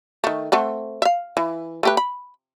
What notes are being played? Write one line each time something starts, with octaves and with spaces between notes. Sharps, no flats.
D#3 A3
A3 C4 F#5
E5 F5
E3
A3 G4 B4
B5